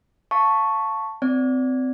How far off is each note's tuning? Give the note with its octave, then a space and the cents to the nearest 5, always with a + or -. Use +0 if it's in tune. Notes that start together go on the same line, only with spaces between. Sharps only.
F5 +0 A5 +5 C#6 +0
C4 -25 D5 -20